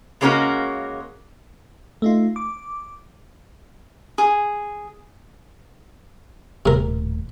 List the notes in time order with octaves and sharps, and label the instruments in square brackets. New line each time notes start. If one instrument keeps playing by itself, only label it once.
[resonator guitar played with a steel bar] C#3 G#3 A#3 C#4 F#4 A#4
[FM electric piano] A3 D#4 F4
D6
[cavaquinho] G#4
[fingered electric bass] D#1 A2 [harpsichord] C3 A#4